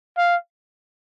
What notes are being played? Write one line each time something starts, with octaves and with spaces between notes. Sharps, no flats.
F5